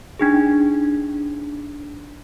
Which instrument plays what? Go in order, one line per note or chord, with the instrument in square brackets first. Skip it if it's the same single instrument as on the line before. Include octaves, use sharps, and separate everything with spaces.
[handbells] D4 D#4 G#4